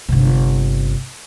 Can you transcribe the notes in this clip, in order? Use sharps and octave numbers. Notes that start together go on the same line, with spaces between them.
G1 C3